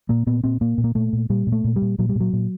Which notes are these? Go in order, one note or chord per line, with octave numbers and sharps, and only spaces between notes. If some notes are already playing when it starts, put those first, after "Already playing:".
A#2 A#3
A#2 B3
A#2 C4
A#2 A#3
A#2
A#3
A#2 A3
A#2
A#2 G3
A#2
A3
A#2
G3
A#2
A#2 F#3
G3
A#2 F#3
A#2